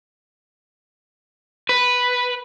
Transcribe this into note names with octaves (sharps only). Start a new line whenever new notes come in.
B4